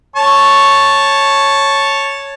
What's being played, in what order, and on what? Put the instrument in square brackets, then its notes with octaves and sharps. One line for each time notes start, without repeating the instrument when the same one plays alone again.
[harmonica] C#5 A5 C#6